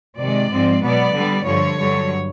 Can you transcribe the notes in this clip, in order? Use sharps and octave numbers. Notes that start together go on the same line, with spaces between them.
C3 D#3 G#3 D5
G#2 F3 G#3 C4
B2 F#3 B3 D5
D3 G3 B3
G2 D3 F3 C#5
G2 D3 F#3